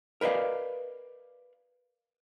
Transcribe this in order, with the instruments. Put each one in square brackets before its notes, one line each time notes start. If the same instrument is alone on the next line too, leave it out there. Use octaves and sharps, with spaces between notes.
[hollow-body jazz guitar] A#4 B4 D5 D#5 F5